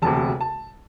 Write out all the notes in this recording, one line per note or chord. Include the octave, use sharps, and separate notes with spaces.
E1 D2 C3 A5
A5